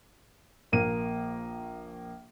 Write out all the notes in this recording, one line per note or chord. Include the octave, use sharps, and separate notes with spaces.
A#1 A#3 D#7